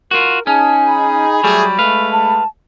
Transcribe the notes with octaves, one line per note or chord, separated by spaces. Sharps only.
F4 F#4 A#4
C#4 D#4 G#4 G#5 A5
B5
F#3 G3 A3 G#4
G#3 A3 B4 F5
A5